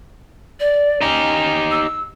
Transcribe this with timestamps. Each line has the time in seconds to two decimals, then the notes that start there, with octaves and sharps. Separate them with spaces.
0.60 D5
1.02 C#4 D#4 G4
1.71 E6